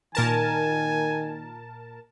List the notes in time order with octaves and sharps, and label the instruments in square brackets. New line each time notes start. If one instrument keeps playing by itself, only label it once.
[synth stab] A#2 A#4 A5 [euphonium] D#3 [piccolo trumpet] G#5